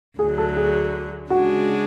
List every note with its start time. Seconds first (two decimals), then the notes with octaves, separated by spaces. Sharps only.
0.19 D2 D3 F#3 G#4
0.38 A4
0.57 G#4
1.30 C#3 G#3 D4 F#4 G#4